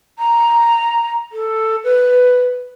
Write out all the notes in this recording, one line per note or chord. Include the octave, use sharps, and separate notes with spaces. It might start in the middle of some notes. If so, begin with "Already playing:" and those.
A#5
A4
B4